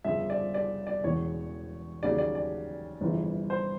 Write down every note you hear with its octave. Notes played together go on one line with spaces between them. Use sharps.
G1 F2 C#3 F3 E5
D5
D5
D5
E1 E2 C#3 C#5
D#2 C#3 F#3 D5
D5
D5
G1 F2 C#3 E3
C5